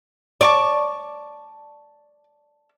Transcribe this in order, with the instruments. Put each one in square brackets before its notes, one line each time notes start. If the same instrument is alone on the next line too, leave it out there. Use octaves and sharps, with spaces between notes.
[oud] D5 [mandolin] A5 C#6 D6